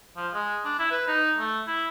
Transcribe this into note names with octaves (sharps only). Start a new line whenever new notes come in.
F3
G#3
D4
E4
B4
D#4
A3
E4